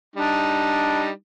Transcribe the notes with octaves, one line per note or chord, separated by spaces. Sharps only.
G3 D4 D#4